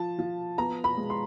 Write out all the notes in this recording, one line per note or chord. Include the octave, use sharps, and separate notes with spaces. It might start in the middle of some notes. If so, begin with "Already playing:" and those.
Already playing: F3 A5
F3
B3 A#5
B5
G#3
C6